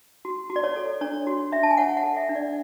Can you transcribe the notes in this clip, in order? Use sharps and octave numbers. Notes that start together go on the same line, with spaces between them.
F#4
F#4
D5
C#5
A4
D4 C#5
F#4
D4 E5
A5
G#5
C#5 F#5
F#5
A4
E5
D4
D5